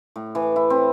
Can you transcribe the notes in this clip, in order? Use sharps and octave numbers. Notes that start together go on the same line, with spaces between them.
A2
E3
E4
C4